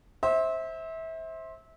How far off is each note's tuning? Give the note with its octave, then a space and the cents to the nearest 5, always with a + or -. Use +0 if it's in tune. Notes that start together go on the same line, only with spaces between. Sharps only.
C5 +20 E5 -25